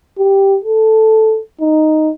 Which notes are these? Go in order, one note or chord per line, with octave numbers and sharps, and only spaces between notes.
G4
A4
D#4